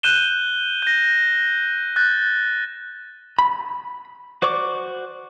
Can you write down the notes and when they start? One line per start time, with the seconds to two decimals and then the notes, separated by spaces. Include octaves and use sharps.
0.03 F#6 G6 D#7 E7 G7
0.82 G6 A#6
1.96 F#6 G6 A6
3.39 B5
4.42 F#4 C5 D5 C#6 D6